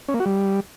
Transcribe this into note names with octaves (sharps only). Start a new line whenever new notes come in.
C#4
A#3
F#4
G3